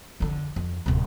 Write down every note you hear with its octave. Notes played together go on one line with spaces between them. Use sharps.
F2 D3
F2
D1 C3